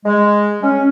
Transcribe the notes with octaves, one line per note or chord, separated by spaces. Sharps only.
G#3
C#4